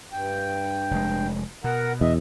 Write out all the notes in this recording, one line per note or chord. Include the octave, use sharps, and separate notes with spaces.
G2 G5
F1 G#3
B2 A#4 F#5 A#5
E2 D#5 E5